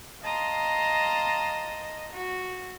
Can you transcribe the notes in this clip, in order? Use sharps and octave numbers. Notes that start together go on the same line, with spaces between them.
D#5 F5 A5 A#5 C6 D#6
F#4